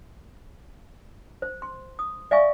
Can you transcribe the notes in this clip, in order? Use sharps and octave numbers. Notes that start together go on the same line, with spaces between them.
C5
C6
D#6
D5 E5 F5 G#5 C#6